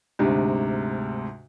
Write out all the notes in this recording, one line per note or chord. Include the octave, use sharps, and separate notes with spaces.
D2 G#2 C3